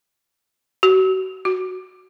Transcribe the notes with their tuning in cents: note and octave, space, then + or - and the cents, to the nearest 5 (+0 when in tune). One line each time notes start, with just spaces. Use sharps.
F#4 +30
F#4 +0